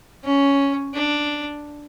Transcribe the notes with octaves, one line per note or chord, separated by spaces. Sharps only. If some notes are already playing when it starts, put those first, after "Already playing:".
C#4
D4